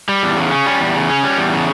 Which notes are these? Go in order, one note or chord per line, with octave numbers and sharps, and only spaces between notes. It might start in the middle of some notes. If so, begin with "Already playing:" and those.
G3
E2
C#3
C#4
G3
E2
C#3
C#4
G3
E2
C#3